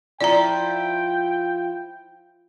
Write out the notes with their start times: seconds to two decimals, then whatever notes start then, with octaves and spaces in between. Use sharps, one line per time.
0.21 F3 E4 F4 D5 G5 A#5